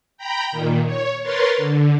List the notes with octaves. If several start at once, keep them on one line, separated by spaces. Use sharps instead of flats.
G5 A#5 B5 G6
A#2 D#3
C#5
A#4 B4 C#5 C6 A6
D3